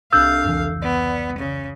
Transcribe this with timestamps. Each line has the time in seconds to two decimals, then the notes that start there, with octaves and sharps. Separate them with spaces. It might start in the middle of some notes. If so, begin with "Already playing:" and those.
0.13 C2 D4 A4 F5 E6 F6 G6
0.44 F1 C#2 E3
0.82 B3 D5
1.38 C#3